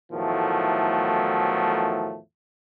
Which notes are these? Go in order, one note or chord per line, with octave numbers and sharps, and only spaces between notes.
E2 A2 D#3 F3 F#3 A3